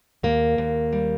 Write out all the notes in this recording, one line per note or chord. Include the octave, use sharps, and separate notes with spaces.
D#2 A#3
D#2
G3